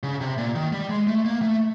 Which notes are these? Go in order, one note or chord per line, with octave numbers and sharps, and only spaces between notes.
C#3
C3
A#2
D#3
G3
G#3
A3
A#3
A3